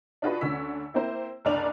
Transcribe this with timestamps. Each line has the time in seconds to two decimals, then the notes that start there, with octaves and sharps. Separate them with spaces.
0.22 D4 D#4 F4 F#4 G#4 B4
0.41 D2 D3 C#4 E6 B6
0.94 A#3 C4 E4 C5
1.45 F#1 C2 D4 D5 F7